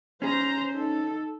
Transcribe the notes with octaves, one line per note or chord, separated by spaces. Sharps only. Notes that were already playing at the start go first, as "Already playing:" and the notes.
C#4 G#4 C5 A#5
D#4 A4